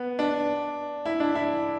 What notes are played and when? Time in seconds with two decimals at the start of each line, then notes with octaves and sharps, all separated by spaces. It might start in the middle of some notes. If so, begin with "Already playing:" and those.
Already playing: B3
0.19 D4
1.05 E4
1.20 D4
1.35 E4